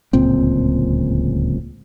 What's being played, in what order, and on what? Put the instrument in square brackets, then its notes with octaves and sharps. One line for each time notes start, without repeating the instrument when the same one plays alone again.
[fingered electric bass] D1 C#2 A#2 C4